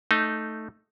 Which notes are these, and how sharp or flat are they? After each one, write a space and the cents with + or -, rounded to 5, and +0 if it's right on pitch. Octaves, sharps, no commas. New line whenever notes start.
A3 +5 D#4 +0